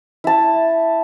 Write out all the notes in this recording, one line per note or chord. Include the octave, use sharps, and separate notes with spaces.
E4 A5